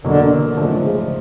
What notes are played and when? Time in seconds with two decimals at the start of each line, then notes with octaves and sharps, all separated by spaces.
0.04 E2 B2 D3 F#3 A#3
0.57 G#2 D3 F3 A3
0.82 C#3